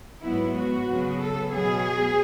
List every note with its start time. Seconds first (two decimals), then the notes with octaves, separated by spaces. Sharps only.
0.21 G#2 F#3 B3 E4
0.55 F#4
0.87 C#3 F#3 B3
1.19 A4
1.51 B2 F#3 B3 G#4